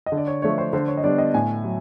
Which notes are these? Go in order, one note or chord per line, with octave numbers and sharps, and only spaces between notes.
D#5
D3
D5
C#5
F3 A3 D4 C#5
C5
D3 C5
C#5
D#5
G3 B3 D4 D5
D#5
A2 G#5
F#3